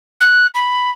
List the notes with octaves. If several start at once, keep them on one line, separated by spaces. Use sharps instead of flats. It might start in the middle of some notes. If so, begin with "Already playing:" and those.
F#6
B5